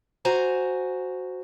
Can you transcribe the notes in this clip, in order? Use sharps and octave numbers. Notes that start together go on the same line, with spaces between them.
F#4 C5 G#5 A#5